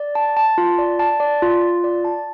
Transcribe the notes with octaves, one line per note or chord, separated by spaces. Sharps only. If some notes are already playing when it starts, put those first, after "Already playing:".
Already playing: D5
A5
A5
F4
D5
A5
D5
F4
F4
D5
A5